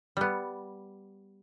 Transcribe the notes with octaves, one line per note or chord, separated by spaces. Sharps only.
G3 B3